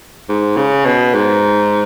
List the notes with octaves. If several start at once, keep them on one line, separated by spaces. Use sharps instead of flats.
G#2
C#3
B2
G#2